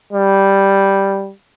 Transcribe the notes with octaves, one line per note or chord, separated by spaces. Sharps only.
G3